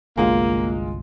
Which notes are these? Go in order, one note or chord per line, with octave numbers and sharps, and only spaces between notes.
G1 C2 F#3 G#3 A#3 F4